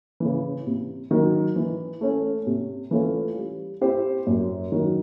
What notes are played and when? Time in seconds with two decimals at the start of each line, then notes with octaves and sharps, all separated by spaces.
0.20 C#3 E3
0.67 C3
1.11 D#3 F#3
1.56 E3
2.01 A3 C#4
2.47 C3
2.91 E3 A3 C#4 F4
3.37 G3
3.81 C4 E4 G4 C5
4.27 F#2
4.72 D#3 F#3